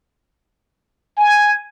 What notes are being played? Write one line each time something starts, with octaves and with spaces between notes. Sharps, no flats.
G#5